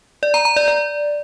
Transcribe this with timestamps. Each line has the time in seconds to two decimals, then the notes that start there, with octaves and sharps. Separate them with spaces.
0.23 D5
0.34 A#5
0.45 A#5
0.57 D5
0.68 D5